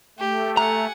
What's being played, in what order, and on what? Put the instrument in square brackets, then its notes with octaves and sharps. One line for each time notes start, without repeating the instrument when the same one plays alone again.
[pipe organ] A3 [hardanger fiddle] G4
[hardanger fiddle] F#5 G#5 [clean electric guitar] A#5